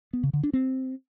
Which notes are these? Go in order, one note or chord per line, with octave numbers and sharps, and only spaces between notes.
B3
C#3
D3
D4
C4